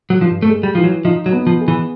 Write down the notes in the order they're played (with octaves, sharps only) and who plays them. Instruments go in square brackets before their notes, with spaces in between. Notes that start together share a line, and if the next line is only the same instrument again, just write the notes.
[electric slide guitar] F#3
[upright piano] G2 [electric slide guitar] F3
[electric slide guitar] A3
[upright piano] G#3
[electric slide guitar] G3
[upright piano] E3 [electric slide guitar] F3
[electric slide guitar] F#3
[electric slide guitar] F3 [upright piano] D#4
[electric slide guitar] F#3
[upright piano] B3
[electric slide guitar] F3
[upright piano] G#4
[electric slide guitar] E3